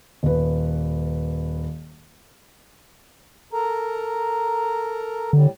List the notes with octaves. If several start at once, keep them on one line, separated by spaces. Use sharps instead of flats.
D#1 B4
A4 A#4 A#5
A2 D3 G3